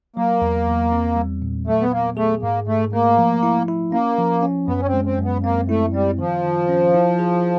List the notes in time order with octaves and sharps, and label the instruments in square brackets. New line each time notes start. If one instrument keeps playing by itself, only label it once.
[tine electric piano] F#3 [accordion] A#3
[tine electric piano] E2
E2
C4
G3
A#2
[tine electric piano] F#3 [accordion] A3
[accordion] B3
[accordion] A#3 [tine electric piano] B3
[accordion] A3 [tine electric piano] G#4
[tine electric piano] G#2 [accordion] A#3
[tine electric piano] G#2 [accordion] A3
[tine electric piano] A3 [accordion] A#3
[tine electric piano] F3
E4
E4
[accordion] A#3 [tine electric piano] C#4
[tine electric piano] F3
C#4
[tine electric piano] F#2 [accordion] B3
[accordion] C#4
C4
[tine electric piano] G#3
[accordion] C4
[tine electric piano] F#2
[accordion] B3
[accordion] A#3 [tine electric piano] C4
[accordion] A3 [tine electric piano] E4
[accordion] G3 [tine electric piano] C4
[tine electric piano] D#3 [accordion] F3
[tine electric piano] D#3
C#4
E4
G#4